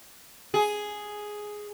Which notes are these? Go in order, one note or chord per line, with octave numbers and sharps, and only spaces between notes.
G#4